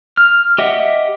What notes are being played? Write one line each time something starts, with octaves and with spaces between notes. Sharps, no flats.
F6
G4 D#5 E5 F#5